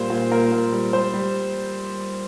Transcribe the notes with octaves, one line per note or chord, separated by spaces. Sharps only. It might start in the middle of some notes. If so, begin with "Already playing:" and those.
Already playing: A#2 G3 C5
A#2
A#2 A#4
A#2
G3
G3 C5
G3